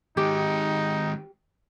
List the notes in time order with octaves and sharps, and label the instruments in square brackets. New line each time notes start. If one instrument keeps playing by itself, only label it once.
[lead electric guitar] D#3 G#3 [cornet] D#4 [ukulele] G4